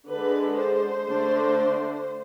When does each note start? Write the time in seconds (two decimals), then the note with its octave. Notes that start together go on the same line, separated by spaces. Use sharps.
0.11 D3 G#3 D4 B4
0.58 C5
1.06 D3 A3 D4